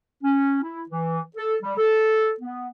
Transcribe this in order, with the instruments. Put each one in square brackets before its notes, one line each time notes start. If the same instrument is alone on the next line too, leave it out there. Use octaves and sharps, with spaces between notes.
[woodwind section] C#4
E4
E3
A4
G3
A4
B3